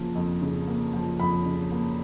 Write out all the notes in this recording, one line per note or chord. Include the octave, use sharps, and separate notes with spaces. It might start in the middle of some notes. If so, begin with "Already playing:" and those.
Already playing: C#3 F3 A#3
F2
C#3
A#3
F3
F2 B5
C#3
A#3